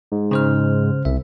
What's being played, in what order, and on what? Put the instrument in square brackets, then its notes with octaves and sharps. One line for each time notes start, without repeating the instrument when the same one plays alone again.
[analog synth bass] G#2
[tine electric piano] C#3 C5 F6
[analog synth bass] C2 [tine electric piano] E5